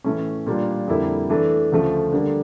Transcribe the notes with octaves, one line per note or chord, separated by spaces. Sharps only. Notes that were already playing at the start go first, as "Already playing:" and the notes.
A2 E3 A3 C#4
A#2 G3 A#3 D4 F4
F2 D3 G3 A#3 E4
E3 A3 D4 A4
D2 C#3 F3 A3
D3 G3 A#3 D4